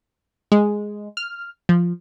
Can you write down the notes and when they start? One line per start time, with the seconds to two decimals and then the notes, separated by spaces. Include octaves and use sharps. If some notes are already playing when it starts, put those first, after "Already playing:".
0.52 G#3
1.17 F6
1.69 F3